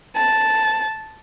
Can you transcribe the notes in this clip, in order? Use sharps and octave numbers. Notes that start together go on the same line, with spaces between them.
A5